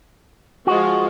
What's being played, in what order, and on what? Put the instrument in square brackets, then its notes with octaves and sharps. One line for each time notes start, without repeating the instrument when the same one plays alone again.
[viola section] F3 G#3 F4 [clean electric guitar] F#4